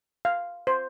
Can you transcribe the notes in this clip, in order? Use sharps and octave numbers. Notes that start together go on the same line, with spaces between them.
F5
C5